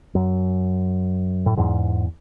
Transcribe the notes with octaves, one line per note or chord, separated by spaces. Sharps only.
F#2
A2
E2 G#2